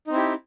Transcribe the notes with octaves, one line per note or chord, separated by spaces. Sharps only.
C4 D#4 E4 G4